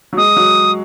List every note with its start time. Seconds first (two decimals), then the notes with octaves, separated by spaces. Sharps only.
0.13 F#3
0.17 G#3 D#6
0.36 F#3